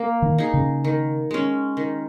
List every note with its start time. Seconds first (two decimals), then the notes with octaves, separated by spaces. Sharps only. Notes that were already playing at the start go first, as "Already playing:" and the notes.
Already playing: A#3
0.22 D#3
0.38 D#4 G#4
0.54 C#3
0.84 D#3
1.31 G#3 C#4
1.77 D#3